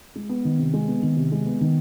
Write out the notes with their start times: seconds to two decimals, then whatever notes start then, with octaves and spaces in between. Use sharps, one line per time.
0.16 G#3
0.29 B3
0.45 D#3
0.59 C3
0.74 G#3
0.88 B3
1.03 D#3
1.16 C3
1.32 G#3
1.46 B3
1.61 D#3